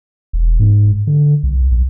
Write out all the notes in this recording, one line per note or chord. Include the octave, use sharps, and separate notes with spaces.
E1
G#2
D3
C2
B1